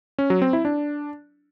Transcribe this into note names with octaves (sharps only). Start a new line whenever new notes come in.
C#4
F#3
C4
E4
D4